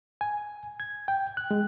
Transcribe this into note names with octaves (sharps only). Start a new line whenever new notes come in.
G#5
G#6
G5
F#6
G#3